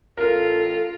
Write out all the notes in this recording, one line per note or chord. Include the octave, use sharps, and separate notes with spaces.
A1 F4 A4 A#4